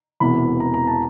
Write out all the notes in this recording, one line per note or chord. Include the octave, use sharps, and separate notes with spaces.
E1 E2 C3 E3 B5
A#5
A#5
A5